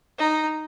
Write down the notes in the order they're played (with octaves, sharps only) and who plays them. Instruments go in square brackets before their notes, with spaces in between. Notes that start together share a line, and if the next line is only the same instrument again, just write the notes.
[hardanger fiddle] D#4